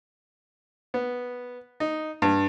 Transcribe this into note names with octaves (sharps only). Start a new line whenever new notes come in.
B3
D#4
G2